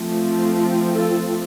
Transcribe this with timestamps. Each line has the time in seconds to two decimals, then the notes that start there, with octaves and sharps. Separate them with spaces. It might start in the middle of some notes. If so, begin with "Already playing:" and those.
Already playing: F3 A3 C4
0.94 F4 A4